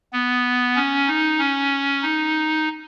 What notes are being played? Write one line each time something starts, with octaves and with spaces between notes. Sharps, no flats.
B3
C#4
D#4
C#4
D#4